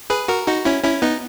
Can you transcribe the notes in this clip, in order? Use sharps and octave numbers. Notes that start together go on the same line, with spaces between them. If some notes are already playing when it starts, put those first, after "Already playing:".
G#4 B4
F#4 A#4
D#4 F#4
C#4 E4
C#4 E4
B3 D#4